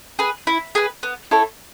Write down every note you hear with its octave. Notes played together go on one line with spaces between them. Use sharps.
G#4 B4
E4
G#4 B4
B3
E4 A4 C#5